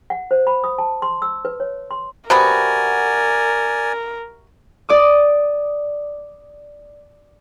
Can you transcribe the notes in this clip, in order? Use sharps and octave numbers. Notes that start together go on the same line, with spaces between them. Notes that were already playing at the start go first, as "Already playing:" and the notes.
F#5
C5
B5
D#6
A5
C6
E6
B4
C#5
C6
C3 B3 F#4 A#4 D5 G#5
D5 D6 D#6